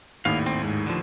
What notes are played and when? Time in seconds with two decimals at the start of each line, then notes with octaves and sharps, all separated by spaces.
0.25 G#1 D#2 A2 F5
0.46 C4
0.64 G#2
0.86 D3 F3